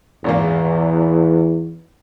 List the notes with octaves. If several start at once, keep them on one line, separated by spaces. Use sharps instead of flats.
G#1 E2 A#2 A#3